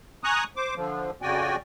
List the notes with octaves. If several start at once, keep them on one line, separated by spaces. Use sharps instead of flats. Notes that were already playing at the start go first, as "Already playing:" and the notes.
G#5 A#5 C#6 D#6 F#6
C5 D6
D3 F3
F2 C#3 F#4 D5 G5 G#5